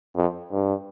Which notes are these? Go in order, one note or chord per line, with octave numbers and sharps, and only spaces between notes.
F2
G2